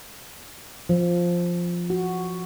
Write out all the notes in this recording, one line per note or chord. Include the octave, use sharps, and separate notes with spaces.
F3
F#4